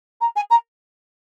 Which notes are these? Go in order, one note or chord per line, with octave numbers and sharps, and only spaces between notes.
A#5
G#5
A#5